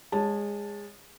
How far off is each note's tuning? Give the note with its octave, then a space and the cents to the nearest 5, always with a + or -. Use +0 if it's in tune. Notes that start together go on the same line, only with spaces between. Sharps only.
G#3 -20 C#5 +0 A5 +0